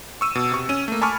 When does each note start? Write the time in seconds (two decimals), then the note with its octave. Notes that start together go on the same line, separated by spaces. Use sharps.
0.21 C#6 E6 D#7
0.35 B2
0.52 C3 C#6
0.69 C#4 D#7
0.88 A3 A#3
1.01 G#5 A5 B5 C#6 D6 F6